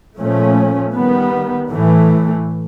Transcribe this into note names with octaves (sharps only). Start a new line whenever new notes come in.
A#2 F3 A3 C#4
D#3 G3 B3
A2 E3 A3